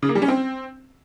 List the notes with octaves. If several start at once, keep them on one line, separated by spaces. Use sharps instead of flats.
C#3
A#3
G3
C#4
C4